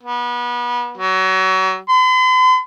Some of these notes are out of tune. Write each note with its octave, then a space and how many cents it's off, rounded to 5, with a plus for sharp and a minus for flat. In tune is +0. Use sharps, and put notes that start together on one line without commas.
B3 -30
F#3 +30
C6 -45